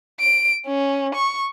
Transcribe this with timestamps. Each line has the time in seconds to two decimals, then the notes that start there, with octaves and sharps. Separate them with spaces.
0.20 D7
0.66 C#4
1.15 C#6